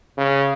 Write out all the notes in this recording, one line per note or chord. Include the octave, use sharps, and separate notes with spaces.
C#3